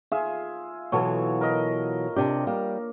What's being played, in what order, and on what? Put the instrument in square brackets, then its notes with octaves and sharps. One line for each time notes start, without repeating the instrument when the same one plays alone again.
[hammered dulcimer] F4 G#4 E5
[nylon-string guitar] B2 E3 F#3 [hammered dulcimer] F4 A4 C#5
[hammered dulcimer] A#4 D#5
[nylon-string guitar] C3 D4 G4
[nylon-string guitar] G3 [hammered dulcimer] A#3